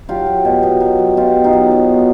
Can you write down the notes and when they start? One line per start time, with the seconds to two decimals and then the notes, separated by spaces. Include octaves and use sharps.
0.09 F#3 F4 G4
0.26 F#3
0.45 B2
0.63 B2
0.80 F#3
0.99 F#3
1.17 B2 F4 G4
1.35 B2
1.44 D#4 F4
1.53 F#3
1.71 F#3
1.89 B2